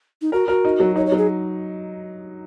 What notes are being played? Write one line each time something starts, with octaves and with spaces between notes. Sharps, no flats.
D#4
F#4 A#4
F#4 A#4
D#4
F#3
D#4 C#5
C#5
F#3
G#4